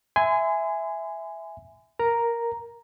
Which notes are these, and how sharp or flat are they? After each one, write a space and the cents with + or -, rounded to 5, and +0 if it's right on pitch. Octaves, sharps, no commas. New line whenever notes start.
E5 +0 G#5 +0 C6 -40
A#4 +5 A#5 +0